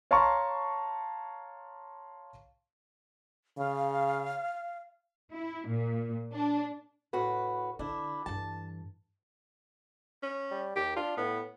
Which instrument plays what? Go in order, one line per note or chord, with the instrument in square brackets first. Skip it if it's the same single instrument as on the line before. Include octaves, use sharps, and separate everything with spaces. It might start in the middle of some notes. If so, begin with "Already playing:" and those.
[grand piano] C#5 F5 A5 A#5 C6 C#6
[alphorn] C#3 [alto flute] F5
[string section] E4
A#2
D4
[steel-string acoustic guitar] A2 F#4 B4
[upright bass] D3 [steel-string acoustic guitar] D4 E4
[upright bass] G2 E3 [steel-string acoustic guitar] A5
[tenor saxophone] C#4
[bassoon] G3
[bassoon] D#2 [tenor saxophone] G4
[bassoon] D4 [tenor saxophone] F4
[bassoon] A2 [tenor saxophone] B3